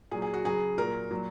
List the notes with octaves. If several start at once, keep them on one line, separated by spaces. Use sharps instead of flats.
A#2 F#3 G#4
G#4
F#4
C#3 F#3 G#4
A#2 F#3 A#4
A#2 F#3